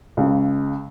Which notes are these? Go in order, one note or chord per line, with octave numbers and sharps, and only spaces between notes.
C#2 C#3